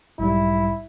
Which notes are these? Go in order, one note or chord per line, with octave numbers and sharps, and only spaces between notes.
B1 G#2 G3 E4